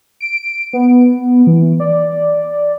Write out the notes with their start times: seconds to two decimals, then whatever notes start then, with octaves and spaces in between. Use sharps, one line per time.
0.21 D7
0.73 B3
1.47 E3
1.80 D5